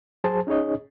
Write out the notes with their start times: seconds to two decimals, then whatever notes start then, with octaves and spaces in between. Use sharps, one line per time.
0.24 F#3 G#4 C5 A5
0.47 C#4 D#4 G#4 C#5 D#5